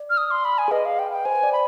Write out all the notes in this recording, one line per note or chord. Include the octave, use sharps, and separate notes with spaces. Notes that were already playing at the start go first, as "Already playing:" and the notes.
Already playing: D5
F6
D#6
C6
B5
G#5
G#4
B4 D#5
F5
G5
G5
C5 G#5
D5
B5